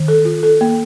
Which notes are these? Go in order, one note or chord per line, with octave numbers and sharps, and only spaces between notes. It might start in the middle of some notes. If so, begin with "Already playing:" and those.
Already playing: D#3
A4
F4
A4
A#3